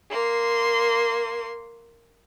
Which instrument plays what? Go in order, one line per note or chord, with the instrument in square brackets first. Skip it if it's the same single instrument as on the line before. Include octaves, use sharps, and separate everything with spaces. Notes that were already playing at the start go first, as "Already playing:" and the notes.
[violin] A#3 C6